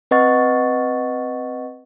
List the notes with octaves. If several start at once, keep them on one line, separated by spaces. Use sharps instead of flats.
C4 B4 D#5 F#5 C#6 A6